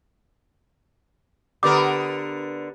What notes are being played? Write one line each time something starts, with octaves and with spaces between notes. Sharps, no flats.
D3 B3 G4 A#4 A#5 D6